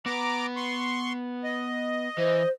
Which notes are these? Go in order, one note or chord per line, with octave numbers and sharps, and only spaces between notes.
B3 B4 A#5 D6
C6 C#6
D#5
E3 C5